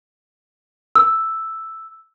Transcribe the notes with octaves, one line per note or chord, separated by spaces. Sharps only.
E6